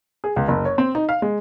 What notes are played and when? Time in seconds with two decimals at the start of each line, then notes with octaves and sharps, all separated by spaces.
0.24 G#4
0.36 C#2
0.48 F#1
0.65 C#5
0.78 C4
0.95 D#4
1.09 F5
1.22 G#3